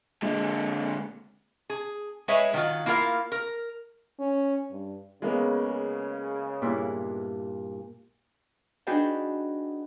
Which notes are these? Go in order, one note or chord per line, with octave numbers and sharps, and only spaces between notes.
A#2 D3 G#3
G#4
G#3 G#4 B4 C#5 E5
D#3 F#3 F4
A#3 E4 F4 A#4 F5
A#4
C#4
G2
C#3 G#3 A#3 B3
G2 A#2 E4
D4 D#4 F#4 G#4 B4 G5